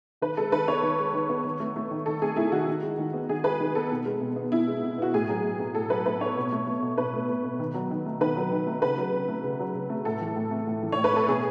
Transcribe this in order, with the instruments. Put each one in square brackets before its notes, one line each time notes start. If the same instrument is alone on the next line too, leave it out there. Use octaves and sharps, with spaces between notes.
[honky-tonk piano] D#3 B4
G#3 A4
D#3 B4
B3 C#5
D#3
G#3
D#3
B3
D#3
A3
A3
D#3
D#3 A4
A3 G#4
A3 E4
D#3 F#4
D#3
G#3
D#3
B3
D#3 G#4
G#3 B4
D#3
B3 A4
B2
G#3
B2
B3
B2 E4
G#3
B2
B3 F#4
A2 G#4
F#3
A2
B3
A2 A4
F#3 B4
A2 B4
B3 C#5
B2
A3
A3
B2
B2 B4
A3
A3
B2
D#3
F#3
D#3
A3
D#3 B4
F#3
D#3
A3
C#3 B4
F#3
C#3
A3
C#3
F#3
C#3
A3
A2 A4
E3
A2
A3
A2
E3
C#5
A2
B4
A3 A4
B2 G#4